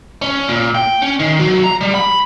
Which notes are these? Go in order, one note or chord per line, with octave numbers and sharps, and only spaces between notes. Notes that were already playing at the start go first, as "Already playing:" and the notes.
C#4
A#2
G5
C#4
D#3
F#3
A#5
G3
B5